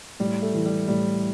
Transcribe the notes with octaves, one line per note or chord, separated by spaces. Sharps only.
A2 G3
A3
E3
G3
A2 G3